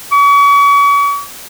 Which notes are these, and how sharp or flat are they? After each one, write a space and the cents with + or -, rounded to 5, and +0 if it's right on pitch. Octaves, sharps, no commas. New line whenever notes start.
C#6 +40